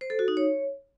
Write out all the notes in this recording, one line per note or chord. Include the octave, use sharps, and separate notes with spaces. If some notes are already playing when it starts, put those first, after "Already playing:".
C5
A4
F#4
D#4
C#5